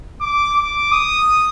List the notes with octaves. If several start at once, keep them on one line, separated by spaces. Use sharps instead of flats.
D6
D6
D#6